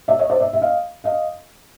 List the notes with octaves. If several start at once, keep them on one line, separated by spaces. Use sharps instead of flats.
D5 E5
C#5 D#5
C5 D5
D5 E5
E5
D#5 F5
D#5 F5